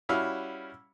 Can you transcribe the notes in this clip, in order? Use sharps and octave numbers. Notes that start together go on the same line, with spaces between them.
G3 C#4 E4 F#4 F5